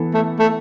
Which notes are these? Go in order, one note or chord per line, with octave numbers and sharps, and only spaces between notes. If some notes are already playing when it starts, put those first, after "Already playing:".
Already playing: E3 B3 A4
A3
A3